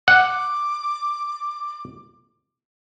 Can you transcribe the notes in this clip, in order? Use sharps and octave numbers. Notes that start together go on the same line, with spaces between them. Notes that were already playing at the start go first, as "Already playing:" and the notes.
F#5 D6